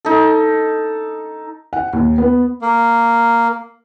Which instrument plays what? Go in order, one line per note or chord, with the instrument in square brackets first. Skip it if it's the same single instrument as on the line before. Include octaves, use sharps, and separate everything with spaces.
[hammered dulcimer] D#4 A4
[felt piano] F#5
D#2
B3
[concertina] A#3